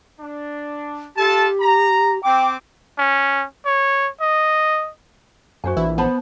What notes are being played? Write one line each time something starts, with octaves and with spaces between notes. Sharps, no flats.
D4
F4 G4 A4 A5
A#5
C4 G5 D6
C#4
C#5
D#5
F#2 F#4 C5 G#5
A#1 E3 E4
B3 C5 A5 B5